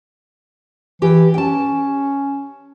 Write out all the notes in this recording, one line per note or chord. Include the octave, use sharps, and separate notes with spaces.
E3 G4
C#4 G5 A5